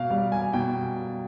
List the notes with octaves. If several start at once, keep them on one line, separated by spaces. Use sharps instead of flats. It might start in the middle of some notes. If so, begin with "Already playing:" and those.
Already playing: B2 F5
G3 F5
G#5
B2 G5